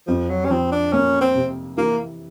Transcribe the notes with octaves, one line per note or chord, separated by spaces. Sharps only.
F2 F3
F#3
C#4
F3 C4
D4
A#3 C#4
C4
C3
E3 A#3